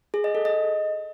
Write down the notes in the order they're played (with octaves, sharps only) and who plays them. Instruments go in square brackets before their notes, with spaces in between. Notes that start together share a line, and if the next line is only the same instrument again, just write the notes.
[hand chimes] G#4
D#5
A4
D#5